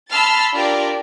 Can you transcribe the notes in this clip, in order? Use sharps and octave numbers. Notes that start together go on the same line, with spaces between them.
A5 B5 C6 E6 F6 A6
D4 F4 G4 A#4 D5